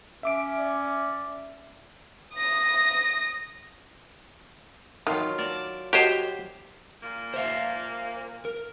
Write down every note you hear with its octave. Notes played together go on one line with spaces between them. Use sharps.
C#4 E5 D6 D7
D5
D#6 A#6
D#3 F#3 F4
A#4 D5 A5
F#4 G4 C5 C#5 D#5
A#2 A#3
C5 E5 F5
A#4